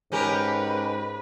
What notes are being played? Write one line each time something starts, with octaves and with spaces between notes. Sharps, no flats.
G#2 C#4 G4 A#4 B4